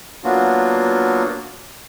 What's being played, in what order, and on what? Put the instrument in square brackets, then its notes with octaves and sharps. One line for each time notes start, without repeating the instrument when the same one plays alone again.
[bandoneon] F#3 A#3 B3 D4 F4 F#4